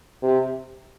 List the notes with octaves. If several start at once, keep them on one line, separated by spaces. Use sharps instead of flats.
C3